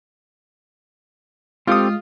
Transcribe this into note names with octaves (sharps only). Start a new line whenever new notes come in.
G#3 C4 F4 G4 A4 D#6